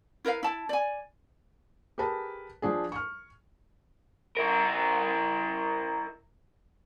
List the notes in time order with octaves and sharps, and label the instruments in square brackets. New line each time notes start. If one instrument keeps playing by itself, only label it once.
[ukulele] E4 A#4 B4 F5
E4 A5
D5 G#5
[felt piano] G4 G#4 A#4 B4 A5
F3 D4 G#4
C#6 F6
[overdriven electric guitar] E4 A#4